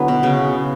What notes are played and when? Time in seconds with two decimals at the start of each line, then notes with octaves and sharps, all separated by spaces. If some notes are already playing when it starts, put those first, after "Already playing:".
Already playing: D3 F#3 B3 E4
0.08 B2
0.23 C#3